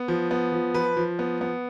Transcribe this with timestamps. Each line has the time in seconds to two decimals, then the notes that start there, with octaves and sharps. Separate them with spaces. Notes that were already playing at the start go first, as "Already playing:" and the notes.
Already playing: B3
0.08 F3
0.31 B3
0.52 F3
0.74 F3 B4
0.97 F3
1.19 B3
1.41 B3